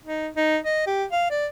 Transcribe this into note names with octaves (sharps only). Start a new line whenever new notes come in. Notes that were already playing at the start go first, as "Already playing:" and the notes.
D#4
D#4
D#5
G4
F5
D5